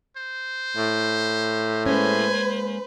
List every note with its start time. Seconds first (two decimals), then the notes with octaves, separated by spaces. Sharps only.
0.17 C5
0.76 A2
1.86 G#3 A#3 C#4 B4 C5 G#5